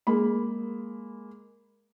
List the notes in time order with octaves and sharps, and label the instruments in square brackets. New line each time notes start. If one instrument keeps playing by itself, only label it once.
[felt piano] G#3 A#3 B5